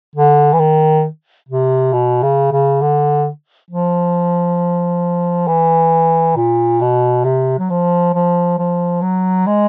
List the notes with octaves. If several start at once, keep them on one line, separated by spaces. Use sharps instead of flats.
D3
E3
D#3
C3
B2
C#3
C#3
D3
F3
E3
A#2
B2
C3
F#3
F3
F3
F3
F#3
G#3